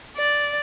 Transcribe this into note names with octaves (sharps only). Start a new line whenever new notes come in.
D5